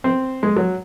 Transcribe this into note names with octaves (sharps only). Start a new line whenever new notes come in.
C4
G#3
F#3